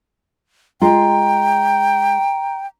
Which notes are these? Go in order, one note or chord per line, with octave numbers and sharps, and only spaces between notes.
G#3 F4 G5 A#5